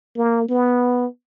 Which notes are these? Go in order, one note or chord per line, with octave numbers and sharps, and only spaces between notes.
A#3
B3